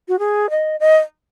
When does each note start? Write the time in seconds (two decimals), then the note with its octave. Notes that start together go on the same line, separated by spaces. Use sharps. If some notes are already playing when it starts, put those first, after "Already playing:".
0.08 F#4
0.19 G#4
0.50 D#5
0.80 D#5